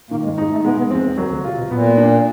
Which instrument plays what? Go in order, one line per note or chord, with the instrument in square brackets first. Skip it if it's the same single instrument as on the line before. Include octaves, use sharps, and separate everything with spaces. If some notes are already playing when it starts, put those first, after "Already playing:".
[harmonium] A#2 A#3 [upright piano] D#3
[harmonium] G#2 G#3
[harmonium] G#2 G#3 [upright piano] D#4
[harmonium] A2 A3
[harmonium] B2 B3 [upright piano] G#3
[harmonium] B2 B3
[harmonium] F2 F3 [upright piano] C4
[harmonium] E2 E3
[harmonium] D#2 D#3 [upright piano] F#3
[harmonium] D2 D3
[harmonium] C3 [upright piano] F4
[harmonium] B2
[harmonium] A#2 [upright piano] B3
[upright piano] D4